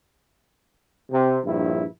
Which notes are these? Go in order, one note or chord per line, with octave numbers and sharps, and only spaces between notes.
C3
A#1 G2 E4